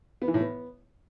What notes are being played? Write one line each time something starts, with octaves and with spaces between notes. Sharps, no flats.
B3
E3
A2
B3